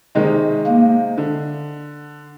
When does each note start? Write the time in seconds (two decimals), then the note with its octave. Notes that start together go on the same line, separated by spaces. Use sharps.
0.15 C3 D#3 G#3 D#4
0.66 A#3
1.18 D3